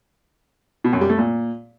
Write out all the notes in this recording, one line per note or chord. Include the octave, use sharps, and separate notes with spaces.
B2
F#2
G3
A3
A#2